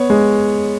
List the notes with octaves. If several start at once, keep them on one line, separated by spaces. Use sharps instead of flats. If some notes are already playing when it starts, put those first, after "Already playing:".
Already playing: B3 C#5
G#3